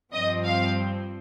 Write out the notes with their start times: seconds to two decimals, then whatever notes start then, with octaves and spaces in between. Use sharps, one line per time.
0.12 G2 F3 C4 D#5
0.45 F5